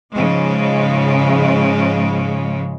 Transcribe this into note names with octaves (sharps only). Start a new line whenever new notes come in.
G#2 C#3 F3 G#3